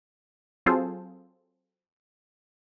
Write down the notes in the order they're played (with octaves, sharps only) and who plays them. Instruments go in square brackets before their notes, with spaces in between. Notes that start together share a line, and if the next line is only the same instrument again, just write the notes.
[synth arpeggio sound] F#3 C4 F4 G#4 A4 C5